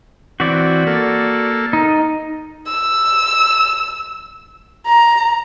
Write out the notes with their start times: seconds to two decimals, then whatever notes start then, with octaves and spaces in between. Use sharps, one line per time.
0.40 E3 C4 F#4 D5
0.87 A#3 A4
1.73 D#4
2.67 E6
4.86 A#5